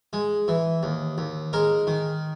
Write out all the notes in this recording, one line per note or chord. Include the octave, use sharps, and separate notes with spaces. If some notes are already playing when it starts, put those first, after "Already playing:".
G#3
E3
D#2
D#2
G#3 A#4
D#3